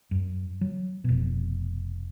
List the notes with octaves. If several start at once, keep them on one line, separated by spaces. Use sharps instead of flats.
F#2
F#3
F1 B2